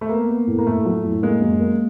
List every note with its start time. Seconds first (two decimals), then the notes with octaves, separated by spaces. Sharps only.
0.01 A3
0.09 A#3 B3
0.29 B3
0.47 A2
0.58 A#3
0.67 A2 A3
0.85 F#3
1.05 A2
1.22 G#3 A#3
1.41 F#2
1.60 A#3